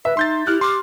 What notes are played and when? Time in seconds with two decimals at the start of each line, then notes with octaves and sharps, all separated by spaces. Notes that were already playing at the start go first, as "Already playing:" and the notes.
0.05 B4 E5
0.17 D#4 C6 G6 A6
0.47 E4 G4 F6 F#6
0.61 C6 D6